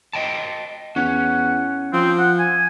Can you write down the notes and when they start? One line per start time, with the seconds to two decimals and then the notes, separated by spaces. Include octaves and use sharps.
0.13 D#5 G5 A5
0.96 E2 C#4 F#5
1.93 F3 C4
2.19 F#5
2.39 G#5